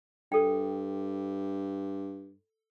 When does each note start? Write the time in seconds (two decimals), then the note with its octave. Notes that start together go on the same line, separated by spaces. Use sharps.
0.32 G2 A4 G5